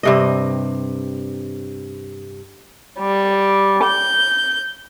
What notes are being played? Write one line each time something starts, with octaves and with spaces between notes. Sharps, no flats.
G2 C3 D#5
G3
G6